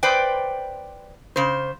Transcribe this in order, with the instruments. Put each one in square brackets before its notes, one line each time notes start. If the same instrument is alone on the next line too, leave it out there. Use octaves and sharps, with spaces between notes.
[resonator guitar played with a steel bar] B4 C5 D5 G5
C#3 C5